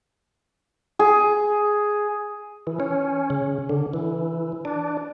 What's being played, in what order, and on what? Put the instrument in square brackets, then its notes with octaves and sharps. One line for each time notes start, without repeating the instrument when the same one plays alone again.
[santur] G#4
[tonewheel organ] E3
C#4
C#3
D3
E3
D4